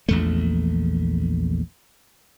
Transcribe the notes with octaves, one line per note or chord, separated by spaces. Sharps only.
A#1 E2 A3